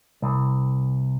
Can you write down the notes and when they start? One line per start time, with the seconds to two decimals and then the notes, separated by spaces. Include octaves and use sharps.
0.22 C2